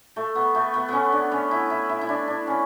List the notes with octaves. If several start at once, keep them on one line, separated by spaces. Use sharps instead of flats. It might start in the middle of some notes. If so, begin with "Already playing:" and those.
A3
B3
A3
B3
B3 C#4
D4
C#4
E4
E4
E4
E4
D4
D4
C#4